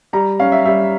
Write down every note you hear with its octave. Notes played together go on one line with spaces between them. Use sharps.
G3 A#5
C#4 F5
E5
G3 E5